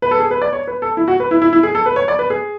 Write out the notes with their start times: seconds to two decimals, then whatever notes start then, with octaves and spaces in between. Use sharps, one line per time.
0.02 B4
0.11 A4
0.20 G#4
0.31 B4
0.42 D5
0.53 C#5
0.68 B4
0.82 A4
0.97 E4
1.08 F#4
1.20 B4
1.31 E4
1.42 E4
1.53 E4
1.63 G#4
1.75 A4
1.86 B4
1.96 C#5
2.08 D5
2.19 B4
2.30 G#4